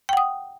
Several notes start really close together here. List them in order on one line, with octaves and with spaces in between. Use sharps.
G5 F#5 D#6